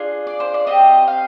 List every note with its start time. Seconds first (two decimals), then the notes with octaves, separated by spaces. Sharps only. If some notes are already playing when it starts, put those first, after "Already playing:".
Already playing: D4 F4 G#4
0.27 D5
0.40 C5
0.54 D5
0.67 C4 G4 D#5
1.08 F5